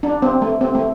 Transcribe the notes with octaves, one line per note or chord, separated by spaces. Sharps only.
D4
C4
A3
C4
A3